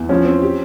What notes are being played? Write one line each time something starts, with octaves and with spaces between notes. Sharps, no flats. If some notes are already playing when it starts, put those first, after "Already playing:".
Already playing: E2
F3 C#4
C4
G4